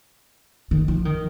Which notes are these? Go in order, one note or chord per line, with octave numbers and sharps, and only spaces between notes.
D#3
F3
D#3